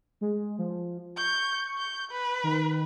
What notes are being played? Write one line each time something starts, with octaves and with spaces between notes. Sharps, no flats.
G#3
F3
C#6 G6
G6
B4
D#3